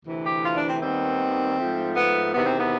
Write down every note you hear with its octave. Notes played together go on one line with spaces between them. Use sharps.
D2 C3 E3
G4
F4
D4
C4
D#2 D#3 G3 B3 C4
G#2 F3 A3
B3
E2 C3 D#3 B3
C4
B3